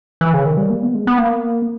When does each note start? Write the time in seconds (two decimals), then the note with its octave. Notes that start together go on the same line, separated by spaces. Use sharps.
0.21 E3
0.34 C#3
0.46 D#3
0.57 G3
0.70 A#3
0.83 B3
0.95 G#3
1.07 B3
1.18 A#3